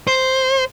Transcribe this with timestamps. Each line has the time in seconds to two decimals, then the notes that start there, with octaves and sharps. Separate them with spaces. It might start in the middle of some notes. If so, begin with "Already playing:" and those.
0.07 C5